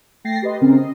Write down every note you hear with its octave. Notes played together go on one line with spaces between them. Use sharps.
A3 G5 A6 A#6 C7
G4 B4 D#5 C6
C#3 C4 C#4 A#4
D#5